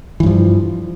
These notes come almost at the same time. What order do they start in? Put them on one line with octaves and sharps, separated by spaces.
E3 G2 F3